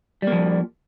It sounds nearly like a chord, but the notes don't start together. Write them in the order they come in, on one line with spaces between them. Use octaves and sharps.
G3 A#3 F3